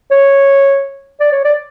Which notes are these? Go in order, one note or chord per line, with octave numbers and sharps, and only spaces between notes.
C#5
D5
C#5
D5